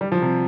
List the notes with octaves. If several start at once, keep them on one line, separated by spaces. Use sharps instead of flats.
G3
F3
C3